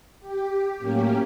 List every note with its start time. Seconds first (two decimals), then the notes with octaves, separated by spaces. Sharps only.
0.20 G4
0.77 A2 F#3 A#3 C#4 G4